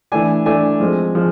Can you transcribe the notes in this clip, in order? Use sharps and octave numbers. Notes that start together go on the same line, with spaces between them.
E3 A3 D4 G#5
E3 A3 D4 G#5
F3 G#3 C4
F3 G#3